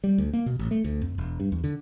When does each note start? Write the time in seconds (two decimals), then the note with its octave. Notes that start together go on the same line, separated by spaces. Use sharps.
0.04 G3
0.18 D2
0.33 A#3
0.46 B2
0.59 A1
0.71 A3
0.85 D2
1.02 F2
1.18 E1
1.40 G2
1.52 E2
1.64 D3